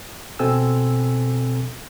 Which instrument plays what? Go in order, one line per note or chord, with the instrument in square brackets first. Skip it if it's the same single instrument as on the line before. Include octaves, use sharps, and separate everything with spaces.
[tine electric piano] B2 C4 A4 G#5 E6